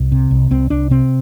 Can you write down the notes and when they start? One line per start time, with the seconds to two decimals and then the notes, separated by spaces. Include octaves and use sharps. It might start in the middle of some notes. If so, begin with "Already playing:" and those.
Already playing: C2
0.12 C3
0.31 C2
0.51 C2 C4
0.70 C2 D4
0.90 C3 C4